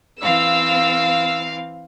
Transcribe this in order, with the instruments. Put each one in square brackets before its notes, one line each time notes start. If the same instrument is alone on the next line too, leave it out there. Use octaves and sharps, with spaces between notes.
[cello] E3 C4 [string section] F5 [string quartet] E6